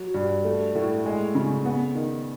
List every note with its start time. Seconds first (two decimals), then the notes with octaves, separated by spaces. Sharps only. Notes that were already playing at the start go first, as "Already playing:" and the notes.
Already playing: F#3
0.14 G2
0.45 A3
0.75 A2
1.05 G#3
1.35 C#3
1.66 B3
1.95 D#3